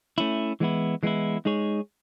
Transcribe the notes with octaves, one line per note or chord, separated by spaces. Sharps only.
A3 C#4 E4
E3 G#3 B3 E4
E3 G#3 B3 E4
G#3 D#4 G#4 C#5